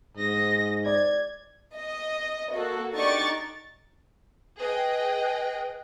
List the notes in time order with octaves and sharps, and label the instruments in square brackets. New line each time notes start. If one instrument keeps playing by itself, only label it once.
[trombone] G#2 [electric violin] D#5 A#6
[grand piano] D5 [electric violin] G#6
[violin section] D#5
A#3 F#4 A4
D4 D#4 G4 D5 C#6 A6
[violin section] G#4 D#5 G5 [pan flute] B4